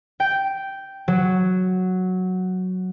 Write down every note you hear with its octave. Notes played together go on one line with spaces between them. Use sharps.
G5
F#3